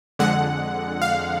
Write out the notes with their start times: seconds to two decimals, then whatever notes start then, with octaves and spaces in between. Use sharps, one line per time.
0.19 F2 D3 G#3 F#5
1.02 F5